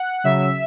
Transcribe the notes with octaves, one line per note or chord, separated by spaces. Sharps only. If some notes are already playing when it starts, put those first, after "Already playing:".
Already playing: F#5
C#3 F#3 E5